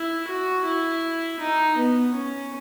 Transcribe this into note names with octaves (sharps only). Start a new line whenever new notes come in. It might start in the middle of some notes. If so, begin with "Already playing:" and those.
Already playing: E4
F#4
E4
D#4
B3
C#4